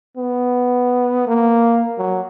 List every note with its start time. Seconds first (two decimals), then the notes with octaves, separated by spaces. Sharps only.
0.17 B3
1.28 A#3
1.98 F#3